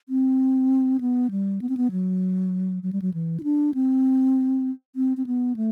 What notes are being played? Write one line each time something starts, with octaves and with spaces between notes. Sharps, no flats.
C4
B3
G3
B3
C4
B3
F#3
F#3
G3
F#3
E3
E4
D4
C4
C4
C4
B3
A3